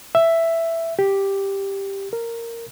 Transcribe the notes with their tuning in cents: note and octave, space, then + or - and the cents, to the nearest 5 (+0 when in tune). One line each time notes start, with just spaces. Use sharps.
E5 +5
G4 +0
A#4 -10